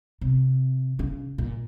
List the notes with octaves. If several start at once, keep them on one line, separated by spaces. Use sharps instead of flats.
C3
C#3
A#2